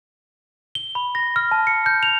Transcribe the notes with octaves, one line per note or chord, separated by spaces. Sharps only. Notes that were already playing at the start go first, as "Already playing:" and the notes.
G7
B5
A#6
F6
A5
C#7
G6
F7